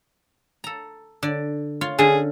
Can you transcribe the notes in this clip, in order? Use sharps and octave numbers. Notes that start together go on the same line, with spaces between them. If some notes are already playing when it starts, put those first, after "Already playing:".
A4 A#5
D3 D5
F4 C#5 F5
D3 C#4 G#4